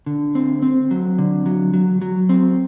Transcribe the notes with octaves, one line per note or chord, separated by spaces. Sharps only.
D3
C4
C4
F#3
D3
F#3
F#3
F#3
C4